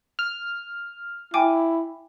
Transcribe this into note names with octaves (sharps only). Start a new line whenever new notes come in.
F6
E4 G5 G#5 D6